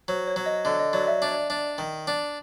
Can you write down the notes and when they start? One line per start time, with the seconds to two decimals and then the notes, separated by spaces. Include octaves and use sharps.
0.08 F#3 C5
0.27 C#5
0.36 F#3
0.46 D#5
0.65 D3 D#5
0.79 D#5
0.93 F#3 D5
1.08 E5
1.22 D4
1.50 D4
1.78 D#3
2.07 D4